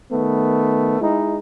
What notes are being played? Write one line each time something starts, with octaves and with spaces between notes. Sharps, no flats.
D#3 A3 B3
G#3 D#4 E4